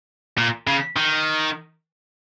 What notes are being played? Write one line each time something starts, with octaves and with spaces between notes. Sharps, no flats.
A#2
C#3
D#3